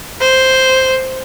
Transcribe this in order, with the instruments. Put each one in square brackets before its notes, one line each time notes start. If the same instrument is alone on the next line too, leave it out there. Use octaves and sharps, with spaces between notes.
[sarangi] C5